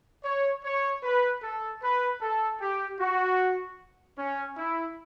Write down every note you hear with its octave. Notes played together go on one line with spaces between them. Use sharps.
C#5
C#5
B4
A4
B4
A4
G4
F#4
C#4
E4